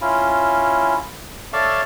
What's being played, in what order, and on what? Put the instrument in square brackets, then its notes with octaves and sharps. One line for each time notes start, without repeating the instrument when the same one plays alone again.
[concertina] C#4 E4 F4
A4 C#5 D5 E5 F5 A5